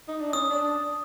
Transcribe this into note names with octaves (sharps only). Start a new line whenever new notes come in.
D#4
D4
C#4 D#6
D4